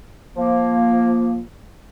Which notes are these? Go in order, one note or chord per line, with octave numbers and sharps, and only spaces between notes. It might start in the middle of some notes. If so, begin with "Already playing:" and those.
F3 A#3